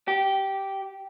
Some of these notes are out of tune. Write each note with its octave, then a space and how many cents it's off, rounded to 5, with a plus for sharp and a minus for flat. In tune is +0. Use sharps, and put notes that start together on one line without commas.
G4 -10